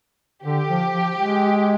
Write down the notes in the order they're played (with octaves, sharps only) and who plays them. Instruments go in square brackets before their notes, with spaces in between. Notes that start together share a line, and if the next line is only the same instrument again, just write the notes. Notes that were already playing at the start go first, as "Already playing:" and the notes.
[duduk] D3 [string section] G4
[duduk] F3
F3
G#3